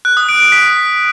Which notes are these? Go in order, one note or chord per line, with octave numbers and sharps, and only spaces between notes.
F#6
D#6
D7
D7
B6